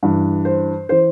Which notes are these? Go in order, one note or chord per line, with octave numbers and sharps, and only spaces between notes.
G2 E3
C5
E3 C5